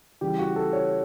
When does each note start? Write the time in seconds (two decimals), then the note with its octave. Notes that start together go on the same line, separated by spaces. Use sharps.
0.21 C#3 E3 G3 G4
0.39 F#4
0.56 A4
0.73 C#5